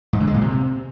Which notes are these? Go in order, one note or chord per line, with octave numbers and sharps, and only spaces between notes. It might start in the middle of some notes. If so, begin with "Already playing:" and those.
G#2
D3
G#3
A#2
C3